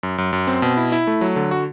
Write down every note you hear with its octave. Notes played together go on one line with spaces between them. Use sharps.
F#2
F#2
F#2
C4
B2
E4
E4
A3
F#3
D3
F#4